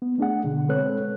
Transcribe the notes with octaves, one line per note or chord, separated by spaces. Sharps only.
B3
A3 D4 G#4 F#5
B2 D3
G#3 C4 A4 B4 C#5 F#6